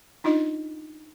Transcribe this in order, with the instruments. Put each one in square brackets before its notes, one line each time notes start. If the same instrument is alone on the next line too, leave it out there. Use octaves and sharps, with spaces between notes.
[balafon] D4 D#4 F4 D#5